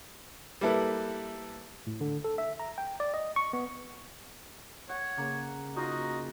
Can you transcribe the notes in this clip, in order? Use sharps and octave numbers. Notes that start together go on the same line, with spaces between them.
G3 A#3 E4 A4 B4
A2
D3
A4
E5
A#5
G5
D5
D#5
C#6
B3
C#5 F#5
C#3 A#3
D#4 F4 F#4 D#5